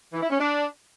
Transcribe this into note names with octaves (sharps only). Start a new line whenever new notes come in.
E3
E4
C#4
D4